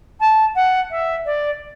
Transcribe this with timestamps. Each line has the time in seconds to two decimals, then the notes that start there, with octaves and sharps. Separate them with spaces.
0.20 A5
0.55 F#5
0.91 E5
1.26 D5